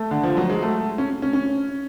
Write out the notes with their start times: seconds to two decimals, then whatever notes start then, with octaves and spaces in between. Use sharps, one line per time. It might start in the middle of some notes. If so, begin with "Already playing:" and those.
Already playing: A3
0.11 D3
0.23 F3
0.37 F#3
0.50 G#3
0.62 A3
0.98 C#4
1.22 C#4
1.33 C#4